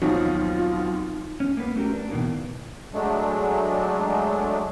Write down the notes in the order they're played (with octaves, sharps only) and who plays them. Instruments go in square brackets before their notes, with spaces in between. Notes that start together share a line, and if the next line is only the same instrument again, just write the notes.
[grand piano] D#2 B2 F3 [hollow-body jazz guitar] F#3 C4 [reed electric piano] D#4 [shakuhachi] F4
[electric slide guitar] C#4
A#3 B3 B4
A3 C#4 F#4 G4 A#4
D4
B2 D#3 E3 A#3 B3
[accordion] F#3 G#3 A3 D4